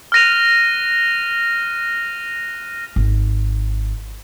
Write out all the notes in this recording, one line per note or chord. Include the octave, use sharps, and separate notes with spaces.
F6 F#6 A#6 D#7 F7
G#1